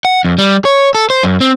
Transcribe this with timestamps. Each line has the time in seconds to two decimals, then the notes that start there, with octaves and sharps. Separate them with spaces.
0.05 F#5
0.25 F2
0.38 G3
0.65 C#5
0.95 A4
1.10 C5
1.23 F#2
1.41 C4